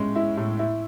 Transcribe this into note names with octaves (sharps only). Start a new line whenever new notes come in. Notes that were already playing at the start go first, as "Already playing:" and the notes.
Already playing: A2 G#3 C#4
E4
A2
E4